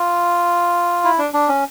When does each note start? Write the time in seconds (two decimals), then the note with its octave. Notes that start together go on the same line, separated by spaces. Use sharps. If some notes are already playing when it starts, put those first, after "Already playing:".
Already playing: F4
1.04 E4
1.19 D4
1.34 D4
1.49 C#4